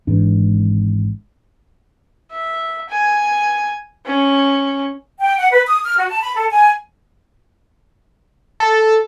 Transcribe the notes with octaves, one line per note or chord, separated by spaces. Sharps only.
G#1 G#2 E3 D4
E5
G#5
C#4
G5
F#5
B4
D#6
F6
F#4
A5
B5
A4
G#5
A4